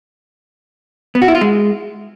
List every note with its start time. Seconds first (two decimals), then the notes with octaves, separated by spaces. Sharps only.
1.15 B3
1.22 F#4
1.28 E4
1.35 F4
1.41 G#3